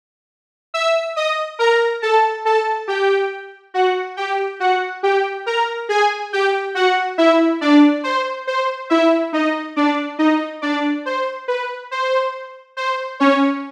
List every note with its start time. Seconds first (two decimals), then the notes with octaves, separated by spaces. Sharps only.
0.74 E5 E6
1.16 D#5 D#6
1.59 A#4 A#5
2.02 A4 A5
2.45 A4 A5
2.88 G4 G5
3.74 F#4 F#5
4.17 G4 G5
4.60 F#4 F#5
5.03 G4 G5
5.46 A#4 A#5
5.89 G#4 G#5
6.33 G4 G5
6.75 F#4 F#5
7.18 E4 E5
7.61 D4 D5
8.04 C5
8.47 C5
8.90 E4 E5
9.33 D#4 D#5
9.76 D4 D5
10.19 D#4 D#5
10.62 D4 D5
11.06 C5
11.48 B4
11.91 C5
12.77 C5
13.20 C#4 C#5